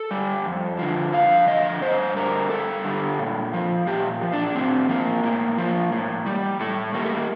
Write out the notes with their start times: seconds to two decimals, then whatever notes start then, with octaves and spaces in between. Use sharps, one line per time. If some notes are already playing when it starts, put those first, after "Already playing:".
Already playing: A4
0.11 G3
0.45 F2
0.79 D3 F3
1.13 F2 F5
1.47 D3 F3 D#5
1.82 G2 C5
2.16 D3 G3 A#4
2.50 G2 A4
2.84 D3 G3
3.19 A#2
3.53 F3
3.87 A#2 G4
4.22 F3
4.33 D4
4.55 A2 C4
4.89 F3 A#3
5.23 A2 A#3
5.58 F3
5.92 A2
6.26 G3
6.60 A2 A3
6.94 G3 A#3
7.02 A3
7.09 A#3